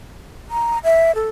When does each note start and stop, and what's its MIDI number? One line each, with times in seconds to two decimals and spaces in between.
0.50 0.78 82
0.84 1.14 76
1.15 1.29 69